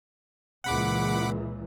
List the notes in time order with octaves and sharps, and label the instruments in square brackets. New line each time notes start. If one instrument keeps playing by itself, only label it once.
[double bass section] C#2 A#2 E3 [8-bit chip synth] F#5 B5 D6